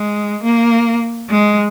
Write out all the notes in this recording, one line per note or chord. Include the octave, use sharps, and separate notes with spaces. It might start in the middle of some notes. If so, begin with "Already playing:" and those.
Already playing: G#3
A#3
G#3